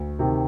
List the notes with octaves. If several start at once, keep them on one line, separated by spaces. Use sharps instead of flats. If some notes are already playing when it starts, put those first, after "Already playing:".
Already playing: D2
C3 D#3